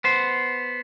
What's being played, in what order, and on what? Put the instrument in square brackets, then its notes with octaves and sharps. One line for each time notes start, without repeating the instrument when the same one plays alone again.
[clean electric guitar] B3 C5